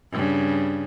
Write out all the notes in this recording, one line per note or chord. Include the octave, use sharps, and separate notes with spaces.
G2 C#3